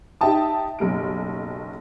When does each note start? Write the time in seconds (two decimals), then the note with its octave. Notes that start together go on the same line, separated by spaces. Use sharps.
0.21 D#4 G4 E5 G5 A5 D#6
0.79 F#1 B1 G3 D7